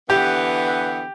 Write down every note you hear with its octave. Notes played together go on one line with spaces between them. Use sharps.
D3 E3 B3 G4